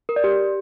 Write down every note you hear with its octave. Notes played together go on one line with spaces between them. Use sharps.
A#4
D5
G4